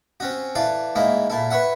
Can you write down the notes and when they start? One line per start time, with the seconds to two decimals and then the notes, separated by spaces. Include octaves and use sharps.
0.20 C4 C#4 F#4
0.55 E3 A4 D5 F5
0.95 G#2 D#3 A#3 E4
1.30 A#2 E4 A4
1.50 B4 C#5 E5 F#5